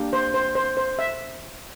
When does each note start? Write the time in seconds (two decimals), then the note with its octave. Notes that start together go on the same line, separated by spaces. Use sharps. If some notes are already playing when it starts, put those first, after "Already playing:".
Already playing: A#3 D4 G4
0.13 C5
0.34 C5
0.55 C5
0.77 C5
0.99 E5